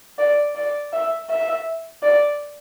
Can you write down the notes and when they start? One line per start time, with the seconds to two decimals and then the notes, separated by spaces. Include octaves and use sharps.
0.19 D5
0.55 D5
0.93 E5
1.30 E5
2.03 D5